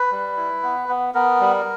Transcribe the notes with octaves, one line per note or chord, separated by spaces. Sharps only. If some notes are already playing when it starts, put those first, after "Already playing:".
Already playing: B4
G3
E4
B3
B3
B3 A#4
G3